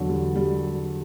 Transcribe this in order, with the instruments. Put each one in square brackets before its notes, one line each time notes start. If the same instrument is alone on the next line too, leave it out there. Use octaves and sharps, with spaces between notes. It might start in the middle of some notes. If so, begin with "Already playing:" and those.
Already playing: [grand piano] E2 D3 F#3
G3
G3